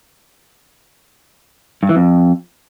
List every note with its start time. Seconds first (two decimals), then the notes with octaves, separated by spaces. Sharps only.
1.83 G2
1.89 E3
1.96 F2